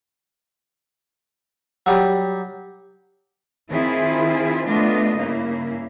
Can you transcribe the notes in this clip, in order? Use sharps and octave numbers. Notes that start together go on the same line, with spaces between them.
F#3 G3
D#3 C4 E4 F4 G#4
A3 B3 D4 F4 D#5
G2 C#3 A#3 E4